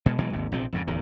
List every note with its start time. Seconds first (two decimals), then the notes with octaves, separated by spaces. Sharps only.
0.06 B2 G#3
0.18 B2 E3 F#3 G#3
0.33 G#1 D#2 C3
0.52 A#1 C3 F3 C4
0.72 F2 G#2 C#3
0.87 D1 E2 D#3